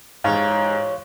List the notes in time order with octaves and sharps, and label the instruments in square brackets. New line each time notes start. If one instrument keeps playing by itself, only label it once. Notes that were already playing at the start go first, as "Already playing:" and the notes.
[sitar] E2 G4 C#5 [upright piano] G#2 [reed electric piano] F5